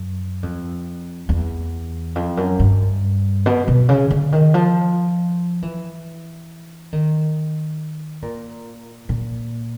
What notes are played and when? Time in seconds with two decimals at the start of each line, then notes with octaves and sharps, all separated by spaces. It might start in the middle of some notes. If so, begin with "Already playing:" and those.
Already playing: F#2
0.43 F2
1.29 E2
2.15 F2
2.37 F#2
2.59 G2
3.46 B2
3.68 B2
3.89 C#3
4.10 D3
4.32 D#3
4.54 F3
5.62 E3
6.93 D#3
8.22 A#2
9.09 A#2